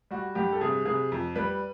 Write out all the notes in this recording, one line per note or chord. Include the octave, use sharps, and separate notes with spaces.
G3 F#4
G2 G4
A4
C3 G#4
C3 G#4
F2
G3 B4